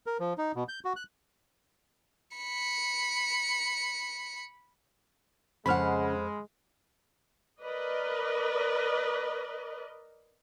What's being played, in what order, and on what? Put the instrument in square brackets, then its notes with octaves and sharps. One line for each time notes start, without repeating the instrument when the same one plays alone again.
[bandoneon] A#4
F3
D#4
B2
G6
F#4
F#6
[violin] B5 C#7
[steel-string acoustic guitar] F2 C5 [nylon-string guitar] C#3 F#5 [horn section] G#3 [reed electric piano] B5 F6
[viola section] A#4 B4 D5 D#5